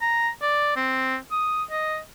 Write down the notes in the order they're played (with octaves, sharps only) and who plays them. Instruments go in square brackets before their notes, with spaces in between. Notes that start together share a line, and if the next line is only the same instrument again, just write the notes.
[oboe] A#5
D5
C4
D#6
D#5